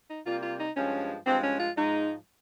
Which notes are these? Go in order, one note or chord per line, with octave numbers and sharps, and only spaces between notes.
D#4
C3 G3 A#3 F4
F4
D#4
G2 F3 G#3 C#4
G2 F3 G#3 C4
C#4
F4
G#2 F3 G#3 D#4